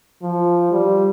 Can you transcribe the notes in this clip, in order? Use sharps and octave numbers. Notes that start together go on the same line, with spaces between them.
F3
G3